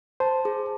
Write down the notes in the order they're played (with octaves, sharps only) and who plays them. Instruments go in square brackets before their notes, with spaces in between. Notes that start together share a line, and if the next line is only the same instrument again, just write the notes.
[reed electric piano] C5 [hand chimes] A5
[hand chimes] G#4